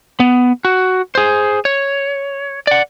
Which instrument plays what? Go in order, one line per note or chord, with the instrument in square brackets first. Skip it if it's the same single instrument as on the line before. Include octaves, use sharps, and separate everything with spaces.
[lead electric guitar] B3
F#4
G#4 C5
C#5
D5 F#5